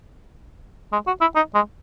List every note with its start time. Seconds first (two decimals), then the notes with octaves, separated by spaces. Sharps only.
0.92 G#3
1.07 F#4
1.21 E4
1.36 D#4
1.55 G#3